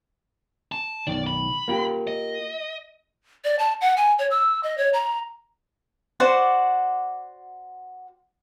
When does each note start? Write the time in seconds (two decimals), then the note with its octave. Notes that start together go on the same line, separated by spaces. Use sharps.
0.72 A5
1.07 B1 D#3 D5
1.27 B5
1.68 A#3 F4 G4
2.07 D#5
3.45 D5
3.59 A5
3.81 F#5
3.97 G#5
4.19 C#5
4.31 E6
4.63 D#5
4.78 C#5
4.93 A#5
6.20 F#4 C5 D5 F#5